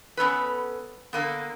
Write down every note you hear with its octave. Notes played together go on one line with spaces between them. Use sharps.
B3 C#4 A4 B4
D3 A#3 B3